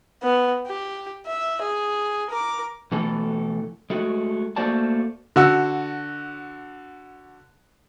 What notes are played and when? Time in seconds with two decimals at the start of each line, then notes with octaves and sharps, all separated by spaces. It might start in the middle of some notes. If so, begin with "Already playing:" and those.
0.23 B3
0.66 G4
1.27 E5
1.62 G#4
2.30 A#4 D6
2.92 B2 E3 A3 A4
3.90 G#3 A3 F#4
4.56 A3 A#3 F#4 C5 D5 A5
5.36 D3 F#4 E6